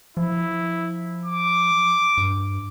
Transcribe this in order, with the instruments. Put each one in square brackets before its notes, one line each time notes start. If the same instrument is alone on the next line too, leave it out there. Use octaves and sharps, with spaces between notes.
[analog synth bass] F3 [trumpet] E4
[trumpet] D6
[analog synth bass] G2